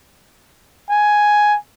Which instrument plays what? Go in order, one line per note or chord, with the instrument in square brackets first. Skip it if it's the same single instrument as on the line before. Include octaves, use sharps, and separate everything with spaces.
[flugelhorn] G#5